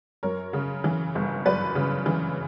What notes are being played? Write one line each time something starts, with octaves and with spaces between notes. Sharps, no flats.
F#2 A#4 C#5
C#3
E3
G1
F#2 B4 D5
C#3
E3